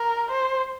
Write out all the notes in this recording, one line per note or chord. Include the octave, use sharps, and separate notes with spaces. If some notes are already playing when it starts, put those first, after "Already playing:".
Already playing: A#4
C5